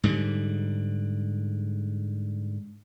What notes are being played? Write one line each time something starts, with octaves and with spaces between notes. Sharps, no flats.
G#2 D3 G3